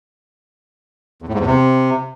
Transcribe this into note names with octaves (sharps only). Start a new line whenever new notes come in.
E2
A2
G#2
E2
C3